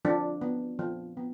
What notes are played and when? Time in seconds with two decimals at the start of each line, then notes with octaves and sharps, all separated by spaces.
0.05 F3 D4
0.41 B3
0.79 F3
1.17 B3